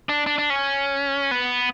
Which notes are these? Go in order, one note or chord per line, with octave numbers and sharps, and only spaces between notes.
D4
D4
D4
C#4
B3